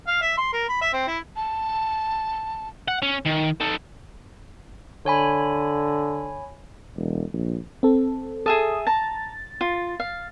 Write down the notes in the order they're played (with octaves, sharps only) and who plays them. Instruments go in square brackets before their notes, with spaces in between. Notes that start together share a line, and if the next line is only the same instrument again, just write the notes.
[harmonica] F5
E5
C6
A#4
B5
E5
C4
E4
[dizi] A5
[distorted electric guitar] F#5
C#4
D#3
D#4 A4
[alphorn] D3 [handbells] C#5 G#5 B5
[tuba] E1
A#1
[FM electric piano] C4 A4
[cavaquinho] G#4 E5 A5 [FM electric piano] A4 D#6
[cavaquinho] A5 A#5 [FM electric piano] A6
[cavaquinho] F4
F5